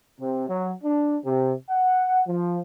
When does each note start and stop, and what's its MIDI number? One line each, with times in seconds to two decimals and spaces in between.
0.20 0.46 48
0.49 0.72 54
0.84 1.17 62
1.24 1.53 48
1.69 2.21 78
2.27 2.59 53